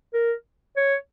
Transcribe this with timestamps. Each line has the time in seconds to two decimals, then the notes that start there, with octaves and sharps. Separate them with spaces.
0.14 A#4
0.76 C#5